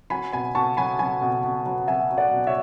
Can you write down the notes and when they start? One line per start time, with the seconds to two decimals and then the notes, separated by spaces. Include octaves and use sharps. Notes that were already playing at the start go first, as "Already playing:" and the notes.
0.10 F#3 G#5 B5
0.33 B2 G#5 B5
0.55 B2 A5 C#6
0.77 F#3 G#5 B5
0.99 F#3 G#5 B5
1.22 B2
1.44 B2
1.66 F#3
1.87 F#3 E5 G#5
2.10 F#3
2.18 D5 F#5
2.32 B2
2.47 C#5 E5